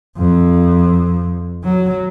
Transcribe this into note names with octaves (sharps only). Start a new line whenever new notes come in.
F2
F#3